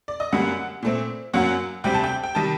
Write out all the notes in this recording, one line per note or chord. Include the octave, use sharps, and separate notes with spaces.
D5
D#5
F#2 D3 G3 A#3 F#5
A#2 A3 C4
F#2 F#3 A#3 F#5
D2 C3 G3 C4 G5
A5
G5
G5
C3 D#3 G3 A5